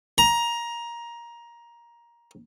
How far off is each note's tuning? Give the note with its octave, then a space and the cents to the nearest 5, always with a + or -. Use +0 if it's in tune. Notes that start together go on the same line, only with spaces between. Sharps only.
A#5 +15